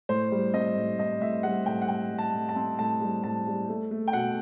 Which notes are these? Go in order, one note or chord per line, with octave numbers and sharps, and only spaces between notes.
A2 C5
G3
C4 D#5
A2
A2 D#5
A2 E5
G3 F#5
A2 G5
F#5
A2 G5
G3
A5
A2
A5
C4
A2 A5
G3
A2 A5
G3
A3
A3
G5
B2 F#5